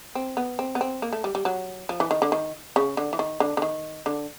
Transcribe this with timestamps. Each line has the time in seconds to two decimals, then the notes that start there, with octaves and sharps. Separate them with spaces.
0.15 C4
0.37 B3
0.59 C4
0.75 B3
0.81 C4
1.02 A#3
1.13 A3
1.24 G3
1.35 G3
1.45 F#3
1.89 F3
2.00 E3
2.11 D#3
2.22 D3
2.32 D#3
2.76 C#3
2.97 D3
3.13 E3
3.19 D#3
3.40 D3
3.57 D3
3.62 D#3
4.06 D3